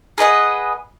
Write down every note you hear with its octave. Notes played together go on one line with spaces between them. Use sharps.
G#4 B4 D#5 F#5